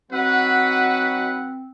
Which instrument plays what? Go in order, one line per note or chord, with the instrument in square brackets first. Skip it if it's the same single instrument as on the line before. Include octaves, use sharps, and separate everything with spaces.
[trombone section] F#3 D#4 F#4 [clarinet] C4 [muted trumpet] B4 [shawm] F#5